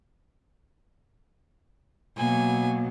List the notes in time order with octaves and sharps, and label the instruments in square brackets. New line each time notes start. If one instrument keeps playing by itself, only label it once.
[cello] B2 F#3 [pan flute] A#3 [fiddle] G#5